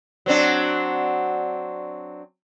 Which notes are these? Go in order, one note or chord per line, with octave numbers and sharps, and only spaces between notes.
F#3 C4 D4